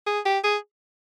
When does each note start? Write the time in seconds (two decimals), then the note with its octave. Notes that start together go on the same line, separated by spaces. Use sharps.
0.07 G#4
0.26 G4
0.44 G#4